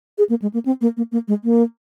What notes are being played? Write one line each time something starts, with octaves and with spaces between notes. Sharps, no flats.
G#4
A#3
G#3
A#3
C4
A#3
A#3
A#3
G#3
A#3